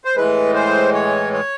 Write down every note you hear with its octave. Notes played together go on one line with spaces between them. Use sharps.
C5
A2 E3 G#3 B4
C5
C#5
C#5